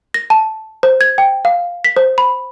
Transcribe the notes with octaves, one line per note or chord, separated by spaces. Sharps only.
A#6
A5
C5
G#6
G5
F5
B6
C5
B5